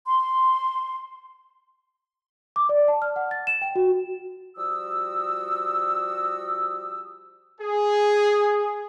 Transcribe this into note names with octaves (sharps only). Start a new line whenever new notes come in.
C6
D6
D5
A5
F6
F#5
A6
E7
G5
F#4
F3 G3 F#4 D#6 E6
G#4